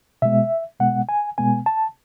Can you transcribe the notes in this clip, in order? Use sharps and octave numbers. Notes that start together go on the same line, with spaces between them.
B2 G#3 B3 E5
B2 G#3 B3 F#5
G#5
B2 G#3 B3 G#5
A5